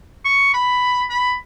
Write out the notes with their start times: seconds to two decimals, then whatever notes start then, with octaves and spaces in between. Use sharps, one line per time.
0.25 C#6
0.54 B5
1.09 B5